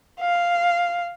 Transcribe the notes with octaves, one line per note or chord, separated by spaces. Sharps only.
F5